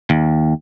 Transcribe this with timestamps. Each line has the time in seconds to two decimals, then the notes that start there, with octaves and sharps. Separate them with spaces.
0.10 D#2